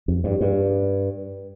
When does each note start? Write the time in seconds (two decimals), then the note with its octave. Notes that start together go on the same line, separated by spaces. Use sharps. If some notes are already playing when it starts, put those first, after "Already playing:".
0.08 F2
0.24 G2
0.41 G2